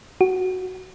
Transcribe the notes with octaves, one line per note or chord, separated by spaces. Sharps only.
F#4